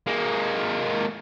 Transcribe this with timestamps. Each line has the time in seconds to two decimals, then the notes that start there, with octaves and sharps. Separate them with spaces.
0.07 G#3 A#3